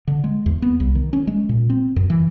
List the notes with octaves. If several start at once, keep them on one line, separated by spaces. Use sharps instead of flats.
D3
G#3
E2
B3
C2
D#3
C#4
G#3
A#2
C4
F#2
E3